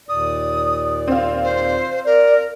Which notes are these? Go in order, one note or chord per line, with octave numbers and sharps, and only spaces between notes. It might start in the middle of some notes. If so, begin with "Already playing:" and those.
D#2 A#2 D5 D#6
C4 F4
C5
A#4 D5